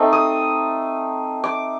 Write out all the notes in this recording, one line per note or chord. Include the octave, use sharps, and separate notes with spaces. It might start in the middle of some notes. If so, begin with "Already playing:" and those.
Already playing: A3 C4 D#4
D#6
D6